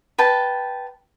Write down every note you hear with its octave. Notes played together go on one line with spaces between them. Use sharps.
B4 G5 A5